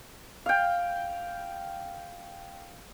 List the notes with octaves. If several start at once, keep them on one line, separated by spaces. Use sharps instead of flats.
F5 G5